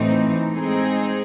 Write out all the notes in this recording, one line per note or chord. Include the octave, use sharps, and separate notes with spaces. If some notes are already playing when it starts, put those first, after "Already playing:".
Already playing: A2 E3 A3 C4 D#4
G#3 C4 D#4 G#4